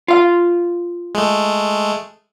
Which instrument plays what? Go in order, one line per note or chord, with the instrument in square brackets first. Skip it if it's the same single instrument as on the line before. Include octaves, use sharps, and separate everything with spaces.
[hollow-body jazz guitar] F4 F5
[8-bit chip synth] G#3 A3